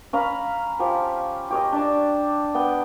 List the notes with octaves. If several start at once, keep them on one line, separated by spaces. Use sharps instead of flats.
C#4 F5 A#5 B5
F3 G4 G#5
G4 C#5 D#5
D4 A5
B3 G5